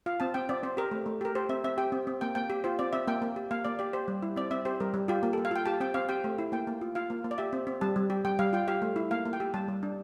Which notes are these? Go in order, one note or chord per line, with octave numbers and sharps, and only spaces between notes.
F4 F5
C4 A5
C4 G5
C4 D5
C4 C5
G4 A#4
A3
A3
G4 A#4
G4 C5
C4 E5
C4 E5
G4 G5
C4
C4
A#3 G5
A#3 G5
G4
F4 C5
C4 D5
C4 E5
A#3 G5
A#3
G4
A#3 F5
A#3 D5
G4 D5
G4 C5
G3
E4
C4 D5
C4 E5
G4 C5
G3 A#4
G3
F4 G4
A#3
A#3 A4
F5
F4 G5
G4 A5
C4 G5
C4 F5
G4 G5
A3
E4
A#3 G5
A#3
F4
F4 F5
A#3
A#3
D5
G4 E5
C4
C4
G3 A5
G3
G4
G3 G5
G3 F5
F4 G5
G4 F5
A3
E4
A#3 F5
A#3
G5
G4
G3 A5
G3
D4